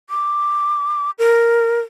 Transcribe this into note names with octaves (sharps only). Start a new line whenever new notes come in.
D6
A#4